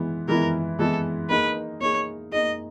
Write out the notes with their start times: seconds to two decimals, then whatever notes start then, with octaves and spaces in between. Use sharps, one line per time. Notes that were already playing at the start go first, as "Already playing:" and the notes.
Already playing: E3 G#3 B3 E4
0.28 E3 G#3 B3 E4 A#4
0.79 E3 G#3 B3 E4 A4
1.30 A#3 D#4 G#4 B4
1.81 A#3 D#4 G#4 C#5
2.32 A#3 D#4 G#4 D#5